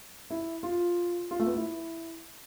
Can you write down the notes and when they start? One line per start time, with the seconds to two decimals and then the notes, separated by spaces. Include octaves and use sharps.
0.30 E4
0.63 F4
1.31 F4
1.40 A3
1.47 B3
1.56 E4